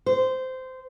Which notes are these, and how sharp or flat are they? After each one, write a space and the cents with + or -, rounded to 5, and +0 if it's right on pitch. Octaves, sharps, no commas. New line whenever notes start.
C5 -15